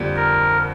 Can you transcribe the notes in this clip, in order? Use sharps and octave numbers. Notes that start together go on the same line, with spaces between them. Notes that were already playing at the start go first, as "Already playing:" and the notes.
Already playing: F2 D3 G3 A#3
A#4